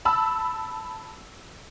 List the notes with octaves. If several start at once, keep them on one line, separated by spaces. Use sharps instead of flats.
A5 B5 E6